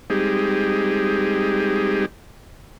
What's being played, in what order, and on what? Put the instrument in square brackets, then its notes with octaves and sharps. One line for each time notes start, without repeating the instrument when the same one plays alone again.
[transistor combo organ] G3 G#3 C4 D#4 G4 G#4